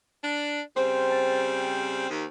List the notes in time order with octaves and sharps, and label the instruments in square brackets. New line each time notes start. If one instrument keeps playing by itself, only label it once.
[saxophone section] D4
[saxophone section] C#3 G3 C4 [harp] C5
[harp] A5
[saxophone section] D#2